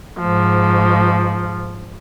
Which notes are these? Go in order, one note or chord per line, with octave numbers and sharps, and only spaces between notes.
G#2 F3